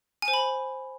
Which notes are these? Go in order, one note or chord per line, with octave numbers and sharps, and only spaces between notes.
G#5
C5
B5